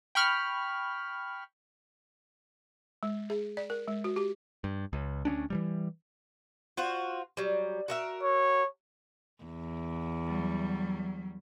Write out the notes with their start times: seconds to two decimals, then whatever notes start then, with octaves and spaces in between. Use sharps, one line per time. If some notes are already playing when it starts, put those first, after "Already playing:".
0.15 G5 B5 C#6 F6
3.03 G#3
3.30 G#4
3.57 D5
3.70 A#4
3.88 G#3
4.04 F#4
4.16 G4
4.64 G2
4.93 C#2
5.25 D2 B3 C#4 D4
5.50 E3 F3 G3
6.77 F4 F#4 C5
7.37 F#3 G3
7.88 F#4 A#4 E5
8.23 C#5
9.44 E2
10.26 F#3 G3